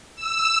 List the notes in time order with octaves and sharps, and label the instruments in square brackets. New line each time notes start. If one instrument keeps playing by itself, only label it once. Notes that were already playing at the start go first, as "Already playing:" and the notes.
[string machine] E6